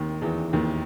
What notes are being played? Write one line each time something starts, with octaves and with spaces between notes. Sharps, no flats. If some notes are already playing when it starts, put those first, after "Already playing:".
Already playing: D#2 D#3
E2 E3
D#2 D#3